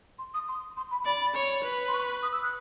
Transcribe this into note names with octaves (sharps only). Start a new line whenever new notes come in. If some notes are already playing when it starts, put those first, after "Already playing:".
C6
D#6
C6
C6
B5
D5 B5
B5
C#5
B4
C6
C#6
D#6
E6
F#6